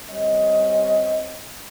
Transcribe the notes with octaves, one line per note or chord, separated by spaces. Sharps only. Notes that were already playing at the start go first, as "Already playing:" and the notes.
G3 C4 C#4 D#5